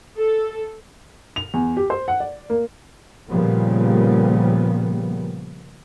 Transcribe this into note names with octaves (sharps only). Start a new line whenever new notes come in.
A4
F7
E2
G4
C5
F#5
D5
A#3
A#2 C#3 F3 G3 A#3 B3